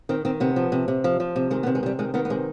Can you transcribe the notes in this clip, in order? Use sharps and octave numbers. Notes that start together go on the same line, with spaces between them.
D#3 C4
D#3 C4
C3 B3
F3
C3
C3
F3
F3
C3
D#3 G#3
B3
C3
G#3
C3 G3
D#3 G#3
D#3 B3
B3
C3 G#3